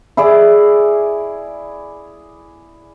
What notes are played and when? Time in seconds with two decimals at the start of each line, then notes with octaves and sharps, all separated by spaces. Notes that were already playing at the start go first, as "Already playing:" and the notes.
0.17 E4 G#4 D5